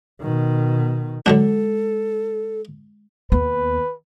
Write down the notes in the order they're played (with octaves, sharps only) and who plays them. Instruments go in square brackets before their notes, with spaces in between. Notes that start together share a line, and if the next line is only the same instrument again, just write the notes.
[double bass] B2 D#3
[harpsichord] D3 F#3 D4 [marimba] G#3 [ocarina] A4
[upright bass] D#2 B3 [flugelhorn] B4